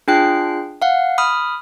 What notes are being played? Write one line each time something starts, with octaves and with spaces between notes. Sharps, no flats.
D4 F4 G#4 G5 F#6 C7
F5 F#5
B5 D#6 F6